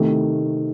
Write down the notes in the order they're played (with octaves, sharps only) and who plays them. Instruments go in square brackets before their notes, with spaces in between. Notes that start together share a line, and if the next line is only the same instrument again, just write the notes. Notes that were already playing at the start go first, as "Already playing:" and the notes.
Already playing: [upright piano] C3 D#3 A3